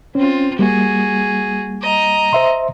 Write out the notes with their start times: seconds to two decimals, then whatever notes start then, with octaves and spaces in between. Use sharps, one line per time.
0.15 C4 C#4 F4
0.59 G3 A#3 F#4 G#4
1.82 D#5 A#5
2.33 C5 E5 C6